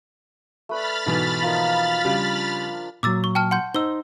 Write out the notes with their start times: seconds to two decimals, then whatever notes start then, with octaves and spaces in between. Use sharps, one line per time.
0.69 A3 B4 D5 B5 F6 A6
1.06 G#2 B2 E3
1.43 F3 A#3 D#4
2.05 C#3 G3 D4 G5
3.03 A#2 F#3 D6 E6 A6
3.24 C#6
3.35 G5 A5 F6
3.51 F#5 C6 G6
3.74 D#4 C5 E6 G7